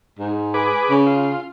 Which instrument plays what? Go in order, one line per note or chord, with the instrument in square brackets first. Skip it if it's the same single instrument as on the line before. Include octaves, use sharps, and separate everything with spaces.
[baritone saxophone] G#2
[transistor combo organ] G#4 B4 D6
[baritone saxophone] C#3
[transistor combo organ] F4